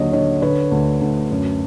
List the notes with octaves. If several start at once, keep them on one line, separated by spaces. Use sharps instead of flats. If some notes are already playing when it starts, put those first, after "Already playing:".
Already playing: D#2 D3 F#3 C#5 D#5
D3 C#5 D#5
D3 B4 C#5
D2
D2
F#2